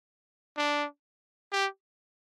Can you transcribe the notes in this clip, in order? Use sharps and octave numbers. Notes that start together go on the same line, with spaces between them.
D4
G4